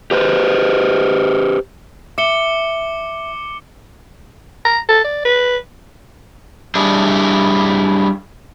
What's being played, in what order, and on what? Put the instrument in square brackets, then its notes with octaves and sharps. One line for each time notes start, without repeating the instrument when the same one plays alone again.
[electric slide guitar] G4 B4 C5
[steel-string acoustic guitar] E5 [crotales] D6 C#7 G7
[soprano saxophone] A#5
A4
D5
B4
[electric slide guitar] G3 D4 E4 G4 G#4